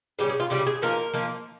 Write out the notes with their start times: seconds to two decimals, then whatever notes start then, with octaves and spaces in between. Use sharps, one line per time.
0.19 C#3 G3 C#4 G4
0.30 G#4
0.40 F4
0.50 C#3 G3 C#4 G4
0.67 G#4
0.82 F3 A#3 D#4 A#4
1.14 F3 A#3 D#4